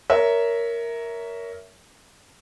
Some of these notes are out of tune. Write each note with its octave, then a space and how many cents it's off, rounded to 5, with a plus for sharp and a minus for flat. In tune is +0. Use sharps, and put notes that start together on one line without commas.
A#4 +0 C#5 +20 E5 -10